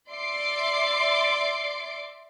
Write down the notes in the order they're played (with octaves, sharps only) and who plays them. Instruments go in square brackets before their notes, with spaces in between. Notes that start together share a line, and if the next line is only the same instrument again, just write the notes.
[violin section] D5 E5 C6 D6 C7 D7